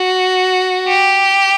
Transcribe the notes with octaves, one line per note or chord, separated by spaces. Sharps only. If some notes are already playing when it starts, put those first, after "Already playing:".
Already playing: F#4
G4